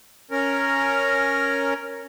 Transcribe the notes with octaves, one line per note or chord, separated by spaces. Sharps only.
C#4 A#4